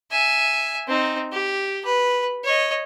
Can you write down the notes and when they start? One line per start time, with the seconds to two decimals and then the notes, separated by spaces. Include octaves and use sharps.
0.11 E5 G#5
0.87 C4 D#4
1.32 G4
1.85 B4
2.44 C#5 D#5